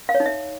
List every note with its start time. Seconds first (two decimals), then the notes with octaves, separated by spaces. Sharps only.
0.09 F5
0.14 C#5
0.20 D#4
0.26 E5